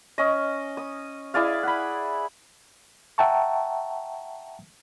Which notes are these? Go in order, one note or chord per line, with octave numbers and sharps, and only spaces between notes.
C#4 D#5
D#6
E4 G#4 D5 F5
F#5 B5
E5 F#5 G5 A5 A#5 C#6